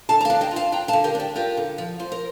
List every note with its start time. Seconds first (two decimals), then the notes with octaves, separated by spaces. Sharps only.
0.09 D3 F5 A5
0.21 A#5
0.25 F5 A5
0.30 D4
0.41 D#5 G5
0.51 F4
0.56 F5 A5
0.72 D4 G5 A#5
0.88 F5 A5
0.93 D3
1.04 G4 A#4
1.15 D4 G4
1.35 F4 G4 A#4
1.57 D3
1.78 F3
1.99 F3 C5
2.12 A#4